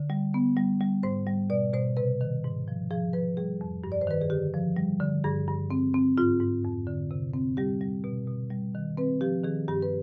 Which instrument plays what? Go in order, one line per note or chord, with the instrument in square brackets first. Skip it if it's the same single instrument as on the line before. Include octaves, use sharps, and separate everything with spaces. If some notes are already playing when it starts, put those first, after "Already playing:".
Already playing: [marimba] D3
G3
B3
G3
G3
G#2 C5
G3
B2 D5
B2 C5
C3 B4
D#3
G#2
F3
F3 G#4
F3 B4
G3 G#4
F2
G2
D5
C5
D#3 B4
G#4
D3 G4
F3
G3
D3
G2 G#4
G2
C4
C4
G#2 F4
G#2
F2
D3
C3
C4
G3 G4
G3
B2
B2
G3
D#3
C4 B4
F3 G4
D#3 G#4
G2 G4
B4